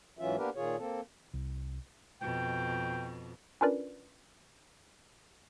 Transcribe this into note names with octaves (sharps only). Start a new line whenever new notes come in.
G#2 E3 F#3 C#4 F4 E5
A#3 B3 D4 G4 A#4 B4
A#2 D#3 F4 G#4 C#5
A#3 C4 A4
C2
F2 B2 G5
C#4 D4 F4 A#4 B4 D5